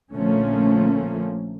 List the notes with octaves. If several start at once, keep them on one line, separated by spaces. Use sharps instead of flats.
A#1 D3 F3 A3 A#3 C#4